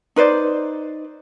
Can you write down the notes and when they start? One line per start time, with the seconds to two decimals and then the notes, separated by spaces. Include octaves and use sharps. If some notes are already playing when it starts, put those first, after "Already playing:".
0.16 D#4 B4 C5 D5